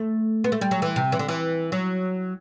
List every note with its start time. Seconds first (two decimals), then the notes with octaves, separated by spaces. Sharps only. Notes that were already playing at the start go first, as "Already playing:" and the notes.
Already playing: A3
0.44 B3
0.52 A3
0.61 G3
0.71 F#3
0.82 E3
0.96 C3
1.12 E3
1.19 D3
1.29 E3
1.72 F#3